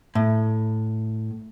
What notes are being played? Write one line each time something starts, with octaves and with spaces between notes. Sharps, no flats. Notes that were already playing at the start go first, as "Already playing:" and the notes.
A2